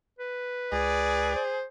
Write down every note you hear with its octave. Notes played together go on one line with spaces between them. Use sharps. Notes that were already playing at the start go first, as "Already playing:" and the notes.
B4
C#2 G#4 D5
C5